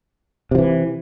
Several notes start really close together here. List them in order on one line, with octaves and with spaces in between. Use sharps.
C3 F3 E3